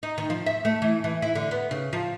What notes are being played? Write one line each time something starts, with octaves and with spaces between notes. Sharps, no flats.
D#4
D#3
F3
E5
A3
E3
E3
E4
D3
B3
C#3
F3